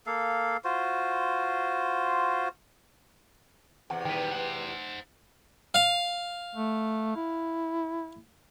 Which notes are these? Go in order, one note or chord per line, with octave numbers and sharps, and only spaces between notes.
A#3 A4 F5
F4 F#4 C5
E2 C3 F#5
D#3 G3 B4 G5
C5 F#5
F5
A3
E4